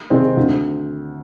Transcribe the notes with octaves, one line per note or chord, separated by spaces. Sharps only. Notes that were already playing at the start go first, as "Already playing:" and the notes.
C3 D#3 G#3 C4
D2